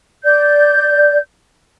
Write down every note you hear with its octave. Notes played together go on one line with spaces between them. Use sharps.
D5 G6